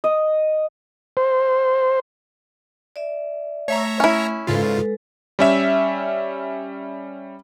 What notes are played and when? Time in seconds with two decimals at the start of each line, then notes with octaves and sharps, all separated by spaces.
0.04 D#5
1.17 C5
2.96 D5 E5
3.68 A3 C#5 E5 A#5
4.00 C#4 E4
4.47 G#2 C#3 G#3 F4 A4 B4
5.39 G3 C#4 E5